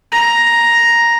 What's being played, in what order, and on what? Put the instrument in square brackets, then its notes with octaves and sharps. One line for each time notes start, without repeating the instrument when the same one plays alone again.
[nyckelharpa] A#5